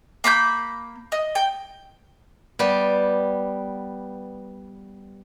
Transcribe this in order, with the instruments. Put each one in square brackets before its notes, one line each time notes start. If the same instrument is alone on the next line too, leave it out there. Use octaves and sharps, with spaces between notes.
[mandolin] A#3 B5 C6 G6
D#5
G5
[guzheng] G3 B3 G4